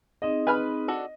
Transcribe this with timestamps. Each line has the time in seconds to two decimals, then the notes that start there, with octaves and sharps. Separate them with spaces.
0.22 C4 D#4 G#4 D#5
0.47 B4 G#5 A5 B5 F6
0.88 D4 F#4 A4